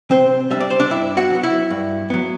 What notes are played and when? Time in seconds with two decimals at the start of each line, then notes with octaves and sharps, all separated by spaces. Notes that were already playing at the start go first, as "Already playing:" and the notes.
0.11 C3 C4 C5
0.50 G3 D4 E5
0.60 D5
0.70 C5
0.80 D4 D5
0.90 G2 E4 E5
1.17 F#4 F#5
1.30 F#3 B3
1.43 E4 E5
1.70 G2
2.10 F#3 B3